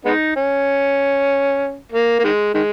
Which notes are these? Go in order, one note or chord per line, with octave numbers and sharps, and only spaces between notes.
G#3 B3 D#4
C#4
A#3
A#3
D#3 G#3
D#3 G#3